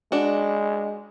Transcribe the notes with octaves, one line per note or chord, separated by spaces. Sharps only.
G#3 D4 F#4